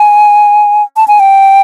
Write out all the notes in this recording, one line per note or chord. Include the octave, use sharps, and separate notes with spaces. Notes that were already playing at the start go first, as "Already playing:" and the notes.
Already playing: G#5
A5
G#5
G5